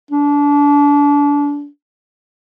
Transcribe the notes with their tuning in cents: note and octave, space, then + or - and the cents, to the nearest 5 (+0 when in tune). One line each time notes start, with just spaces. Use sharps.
D4 -30